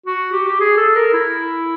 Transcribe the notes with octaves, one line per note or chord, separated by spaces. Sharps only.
F#4
G4
G4
G#4
A4
A#4
E4